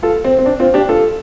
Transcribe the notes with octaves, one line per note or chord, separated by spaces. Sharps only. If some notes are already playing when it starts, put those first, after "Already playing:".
F4 A4
C4
C4
D4
C4 F4
D4 G4
F4 A4